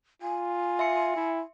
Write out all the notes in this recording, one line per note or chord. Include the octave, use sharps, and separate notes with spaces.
F4 G#5
E5 C6 C#7
E4